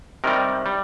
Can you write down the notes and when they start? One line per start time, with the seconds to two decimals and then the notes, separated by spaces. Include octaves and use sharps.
0.24 C3 D#3 G3 A#4
0.66 G3